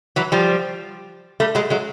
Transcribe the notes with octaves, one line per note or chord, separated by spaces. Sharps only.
E3 F#3
F3 G3
G3 A3
F#3 G#3
F#3 G#3